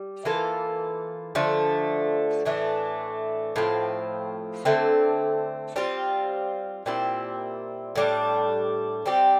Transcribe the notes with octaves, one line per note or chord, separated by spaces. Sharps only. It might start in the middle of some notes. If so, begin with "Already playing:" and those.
Already playing: G3
E3 A#3 F4 A4
D3 F3 A3
A2 E3 A3 D4
A2 F3 C4
D3 A3 C4
G3 C4 F4
A#2 G3 C4 E4
A2 G3 D4
G3 C4 G4